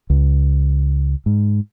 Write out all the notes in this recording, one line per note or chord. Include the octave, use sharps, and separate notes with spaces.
C#2
G#2